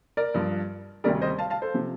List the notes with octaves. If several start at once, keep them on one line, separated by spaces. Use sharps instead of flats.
A#4 D5
G2 F3
D2 C3 D#3 G3 A#4 D5
C5 D#5
F5 A5
F5 A5
A4 C5
C3 F3